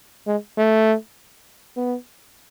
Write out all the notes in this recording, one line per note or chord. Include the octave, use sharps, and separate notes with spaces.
G#3
A3
B3